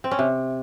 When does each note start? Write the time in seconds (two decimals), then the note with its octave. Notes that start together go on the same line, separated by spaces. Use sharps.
0.04 C4
0.11 C#4
0.19 C3